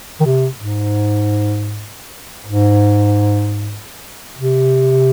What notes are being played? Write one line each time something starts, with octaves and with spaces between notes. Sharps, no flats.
D#3
C3
G#2
G#2
C3